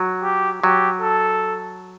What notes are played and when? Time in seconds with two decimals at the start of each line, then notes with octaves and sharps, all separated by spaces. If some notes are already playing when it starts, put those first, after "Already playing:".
Already playing: F#3
0.23 G4
0.62 F#3 G4
1.02 A4